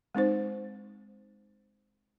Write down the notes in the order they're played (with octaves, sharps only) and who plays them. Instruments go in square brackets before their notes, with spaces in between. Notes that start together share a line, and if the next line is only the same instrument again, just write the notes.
[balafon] G#3 C4 D#4 C5